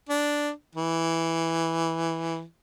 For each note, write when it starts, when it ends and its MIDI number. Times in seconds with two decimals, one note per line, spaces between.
0.09 0.49 62
0.75 2.42 52